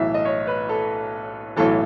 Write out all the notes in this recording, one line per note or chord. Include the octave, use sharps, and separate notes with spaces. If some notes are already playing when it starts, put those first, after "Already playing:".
Already playing: B1 A2 E3 E5
D#5
C#5
B4
A4
B1 A2 E3 A4